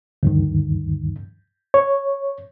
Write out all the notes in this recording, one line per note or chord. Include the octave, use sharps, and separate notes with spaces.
D2 G2 D#3
C#5